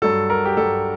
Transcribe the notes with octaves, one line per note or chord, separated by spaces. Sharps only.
G2 F#3 A4
A#4
G4
G2 F#3 A4